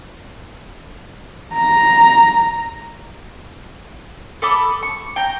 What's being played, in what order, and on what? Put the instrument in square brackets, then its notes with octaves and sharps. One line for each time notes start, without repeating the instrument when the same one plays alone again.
[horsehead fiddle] A#5
[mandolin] A4 B5 D6 D#6
C#6
G5 A#5